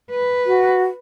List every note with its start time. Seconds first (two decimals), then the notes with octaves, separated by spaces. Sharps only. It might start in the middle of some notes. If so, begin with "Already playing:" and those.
0.11 B4
0.46 F#4